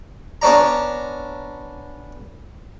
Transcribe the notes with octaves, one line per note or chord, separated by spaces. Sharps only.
B3 C#4 D4 A#5